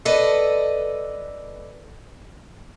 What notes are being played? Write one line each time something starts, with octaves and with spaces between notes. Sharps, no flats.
A4 B4 D5 D#5